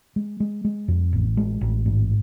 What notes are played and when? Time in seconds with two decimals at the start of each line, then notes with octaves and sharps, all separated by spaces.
0.16 G#3
0.40 G#3
0.65 G#3
0.88 F2
1.13 A1
1.37 G#3
1.61 A1
1.86 G#2